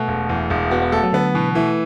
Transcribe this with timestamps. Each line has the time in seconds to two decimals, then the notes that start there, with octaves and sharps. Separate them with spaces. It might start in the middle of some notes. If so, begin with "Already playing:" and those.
Already playing: B2 A3
0.08 E1
0.29 E2
0.50 E1
0.71 B3 F#4
0.82 B3
0.92 A3 A4
1.03 F#3
1.13 D3 B3
1.34 B2 E3
1.55 E3 A3